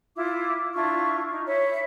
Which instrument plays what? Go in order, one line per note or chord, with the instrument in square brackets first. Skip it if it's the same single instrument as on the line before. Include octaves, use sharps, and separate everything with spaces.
[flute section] E4 F4 D6
D4 E4 F4 C#6
D#4
C#5 E5 B5